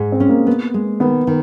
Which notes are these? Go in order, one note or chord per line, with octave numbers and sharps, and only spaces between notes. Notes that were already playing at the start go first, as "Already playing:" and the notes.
Already playing: G#2 G#3
C4
C#4
A#3
B3
G#3
D#3 B3
D#3